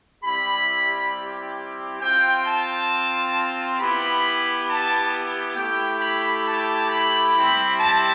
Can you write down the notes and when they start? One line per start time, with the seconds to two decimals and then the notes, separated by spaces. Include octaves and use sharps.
0.23 G3 C4 E4 G4 B5
2.01 C4 F4 G5
2.45 A5
3.79 B3 E4 G4 B5
4.68 A5
5.56 A3 E4 G4 G5
6.01 B5
6.46 A5
6.90 B5
7.35 G3 C4 E4 G4
7.79 A5